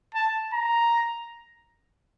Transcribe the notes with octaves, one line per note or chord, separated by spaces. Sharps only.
A5
A#5